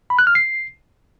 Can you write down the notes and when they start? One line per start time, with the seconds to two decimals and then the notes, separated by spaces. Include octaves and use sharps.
0.10 B5
0.19 F#6
0.27 F6
0.35 C7